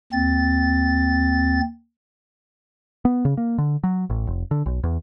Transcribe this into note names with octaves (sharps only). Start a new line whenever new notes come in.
D#2 C4 A6
B3
C#3
A#3
D3
F#3
A1
F1
D3
B1
E2